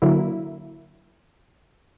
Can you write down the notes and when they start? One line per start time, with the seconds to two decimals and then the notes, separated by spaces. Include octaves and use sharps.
0.02 D3 F#3 A#3 E4